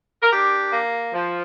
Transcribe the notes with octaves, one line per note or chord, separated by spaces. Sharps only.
A#4
D4 G4
A#3
F3